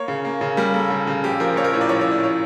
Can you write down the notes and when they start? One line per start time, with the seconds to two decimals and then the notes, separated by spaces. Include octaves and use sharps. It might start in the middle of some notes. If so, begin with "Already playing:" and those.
Already playing: A#3 C#5
0.08 C#3
0.25 A#3
0.41 C#3
0.57 G3 A#4
0.74 A#3 A4
0.90 C#3
1.07 C#3
1.24 A#1 G4
1.40 F3 A#4
1.56 A#1 C#5
1.64 A#4
1.73 A2 C#5
1.81 D5
1.89 A#1 C#5
2.01 C#5
2.07 A2 D5
2.23 C#5